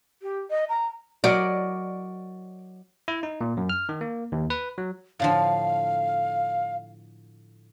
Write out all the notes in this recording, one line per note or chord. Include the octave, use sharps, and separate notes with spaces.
G4
D#5
A#5
F#3 A#4 D5 D#5
E4
D#4
A#2
F#2
F6
D#3
A#3
D#2
B4
F#3
A2 D3 F3 F5